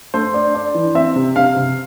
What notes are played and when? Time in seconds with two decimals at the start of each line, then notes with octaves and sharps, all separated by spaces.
0.14 A3 C5
0.34 D4
0.54 D4
0.75 E3
0.95 C4 E5
1.16 C3
1.36 C3 F5
1.56 C3